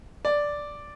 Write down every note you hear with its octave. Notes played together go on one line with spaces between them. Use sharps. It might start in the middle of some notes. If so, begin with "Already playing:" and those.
D5